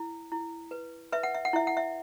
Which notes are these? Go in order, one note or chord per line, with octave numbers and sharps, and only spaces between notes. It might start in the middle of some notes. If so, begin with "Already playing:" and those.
Already playing: E4
E4
B4
B4 E5
F#5
E5
F#5
E4 E5
F#5
E5